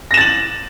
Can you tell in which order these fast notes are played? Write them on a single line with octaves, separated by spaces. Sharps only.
A#6 E7 A6 F#7